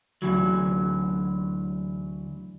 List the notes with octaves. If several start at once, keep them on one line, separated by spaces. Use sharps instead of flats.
D2 E3 F#3